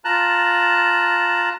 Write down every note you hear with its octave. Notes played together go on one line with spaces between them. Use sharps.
F4 A5 A#5 F#6